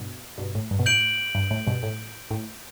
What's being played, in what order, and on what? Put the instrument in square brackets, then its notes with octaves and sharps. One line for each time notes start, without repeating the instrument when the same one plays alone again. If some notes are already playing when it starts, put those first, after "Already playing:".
Already playing: [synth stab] G2 B2
G2 B2
A2
G2
B2
[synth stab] A2 [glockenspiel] G6 D7 F#7
[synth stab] G2
A2
G2 B2
A2
A2